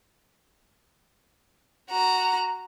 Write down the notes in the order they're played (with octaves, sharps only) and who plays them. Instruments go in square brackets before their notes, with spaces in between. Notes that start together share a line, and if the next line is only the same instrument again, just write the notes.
[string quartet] F#4 A#5